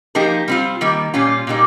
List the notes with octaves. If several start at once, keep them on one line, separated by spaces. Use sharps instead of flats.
F3 A#3 D#4 G4 A#4
G3 C4 F4
D#3 G3 A#3
A#2 G3 C#4 F4
A#2 G3 A#3 D#4